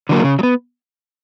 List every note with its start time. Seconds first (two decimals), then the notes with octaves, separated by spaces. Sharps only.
0.09 D3 F#3 A#3
0.24 C#3
0.39 F#3
0.43 B3